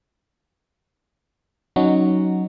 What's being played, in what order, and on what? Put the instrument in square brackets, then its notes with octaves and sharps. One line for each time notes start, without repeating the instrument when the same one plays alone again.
[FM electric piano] F#3 C#4 D#4 F#4